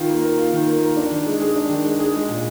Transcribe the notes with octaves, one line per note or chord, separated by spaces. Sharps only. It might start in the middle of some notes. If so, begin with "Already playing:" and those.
Already playing: D#3 F4
A#3
A#4
F4
D#3
A#3
A#4
D4
D#3
G#3
G#4
D4
D#3
G#3
G#4
G#3
A#2